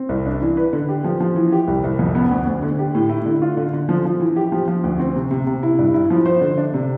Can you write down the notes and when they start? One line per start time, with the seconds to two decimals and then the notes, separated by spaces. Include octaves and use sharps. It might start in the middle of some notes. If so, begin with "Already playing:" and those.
Already playing: C4
0.09 C2
0.26 D4
0.42 E3
0.57 B4
0.73 D3
0.89 G4
1.04 F3
1.20 F3
1.36 E3
1.52 G4
1.68 C2
1.84 C2
1.99 F2
2.15 B3
2.31 D2
2.47 D2
2.63 D3
2.79 G4
2.95 A2
3.09 E4
3.26 D3
3.42 F4
3.57 D3
3.73 D3
3.89 F3
4.05 F3
4.20 E3
4.36 G4
4.52 F3
4.68 F3
4.84 D2
5.00 C4
5.16 C3
5.31 C3
5.47 C3
5.63 E4
5.79 G2
5.94 E4
6.10 F3
6.26 C5
6.41 D3
6.58 D4
6.74 C3